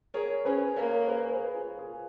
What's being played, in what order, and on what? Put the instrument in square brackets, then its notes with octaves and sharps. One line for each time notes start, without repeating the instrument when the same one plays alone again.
[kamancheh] G#4 [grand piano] A#4 C#5
[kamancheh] C#4 [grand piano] G#4 B4
[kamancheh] A#3 [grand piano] A#4 C#5
[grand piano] G#4 B4
G#4 B4
F4 G#4
F4 G#4